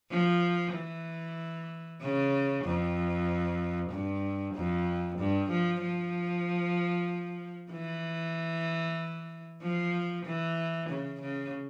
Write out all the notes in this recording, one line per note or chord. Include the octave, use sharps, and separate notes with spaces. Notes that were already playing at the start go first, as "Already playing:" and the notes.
F3
E3
C#3
F2
G2
F2
G2
F3
F3
E3
F3
E3
C#3
C#3